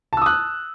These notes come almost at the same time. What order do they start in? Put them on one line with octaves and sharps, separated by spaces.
A5 E6 D#6 F#6